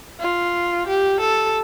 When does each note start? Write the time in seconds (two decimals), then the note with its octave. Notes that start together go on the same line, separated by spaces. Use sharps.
0.20 F4
0.87 G4
1.20 A4